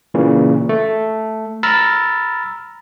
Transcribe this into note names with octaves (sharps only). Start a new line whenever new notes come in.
A#2 C#3 E3
A3
A#5 B5 E6 F6 A6